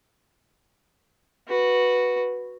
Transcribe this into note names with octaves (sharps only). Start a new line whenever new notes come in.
F#4 B4